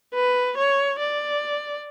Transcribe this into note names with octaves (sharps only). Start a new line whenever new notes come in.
B4
C#5
D5